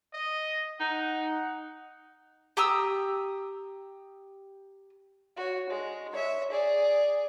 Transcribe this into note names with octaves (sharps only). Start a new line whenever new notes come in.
D#5
D#4 F#5
G4 A#5 D#6 E6
F#4 C#5
G#3
C#5 E5
G#4 D5